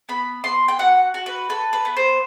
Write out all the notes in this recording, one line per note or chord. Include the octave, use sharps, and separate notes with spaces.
B3 B5
B3 C6
G5
F#4 F#5
F#4
B4
A4 B4
B4
B3
C5